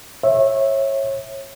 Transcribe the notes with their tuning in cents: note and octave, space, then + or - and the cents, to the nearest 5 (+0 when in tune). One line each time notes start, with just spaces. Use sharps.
C#5 -25 E5 -5